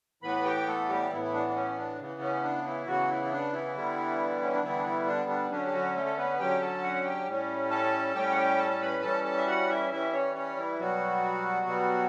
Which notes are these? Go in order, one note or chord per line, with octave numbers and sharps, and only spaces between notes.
A2 E3 B3 B4 B5
G4 G5
A3 A4
G3 G4
A2 E3 B3 E4
E4
D4
D4
C#4
D4
C#3 E3 B3
C#4
D4
E3 E4
C#3 E3 F#3 B3 F#4
E3 E4
E4
D4
E3 E4
D3 G3 B3
C#4
D4
D3 E3 G3 B3 E4
D4
E3 E4
D4
D4
D3 F#3 C#4 D4
G4
F#3 F#4
A3 A4
A4
B3 B4
D3 F#3 C#4 G4 G5
A4 A5
F#4 F#5
G4 G5
A2 G3 C#4
A4 A5
A2 G3 C#4 G4 G5
F#5
G4 G5
A4 A5
A5
B4 B5
E3 G3 C#4 A4 A5
A4 A5
E5
F#4 F#5
E4 E5
E3 G3 C#4 E4 E5
C#4 C#5
C#4 C#5
E3 E4
B2 F#3 G3 B3 F#4
B2 G3 B3